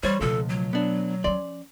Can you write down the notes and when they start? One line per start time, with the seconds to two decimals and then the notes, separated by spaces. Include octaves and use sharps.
0.03 E3 G3 C5 C#5
0.21 C#2 G2 B2 F3 A3 A4
0.49 F#3
0.73 B3 D4
1.24 F3 C#4 D5 C6